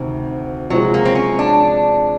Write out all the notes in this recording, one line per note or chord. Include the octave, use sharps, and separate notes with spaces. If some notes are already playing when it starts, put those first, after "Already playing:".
Already playing: D2 C3 D#3
C3 F3 F#3 G#3
A#3
C4
C#4
D4